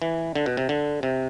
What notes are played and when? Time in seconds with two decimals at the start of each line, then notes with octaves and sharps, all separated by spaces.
0.02 E3
0.35 D3
0.46 B2
0.57 C3
0.69 D3
1.03 C3